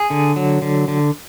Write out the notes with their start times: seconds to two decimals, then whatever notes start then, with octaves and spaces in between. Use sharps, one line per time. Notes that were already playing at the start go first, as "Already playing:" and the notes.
Already playing: G#4
0.10 D3
0.36 F#3
0.62 D3
0.88 D3